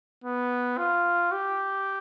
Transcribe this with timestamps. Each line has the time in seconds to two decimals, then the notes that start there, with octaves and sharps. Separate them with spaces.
0.24 B3
0.78 F4
1.32 G4